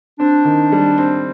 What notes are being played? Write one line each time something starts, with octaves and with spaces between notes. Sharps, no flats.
C4 D4
D#3
G3
C4